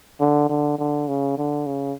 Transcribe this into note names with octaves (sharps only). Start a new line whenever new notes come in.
D3
D3
D3
C#3
D3
C#3